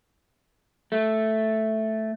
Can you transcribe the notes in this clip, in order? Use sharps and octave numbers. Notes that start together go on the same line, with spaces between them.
A3